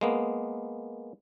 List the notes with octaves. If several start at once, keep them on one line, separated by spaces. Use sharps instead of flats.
G#3 A#3 B3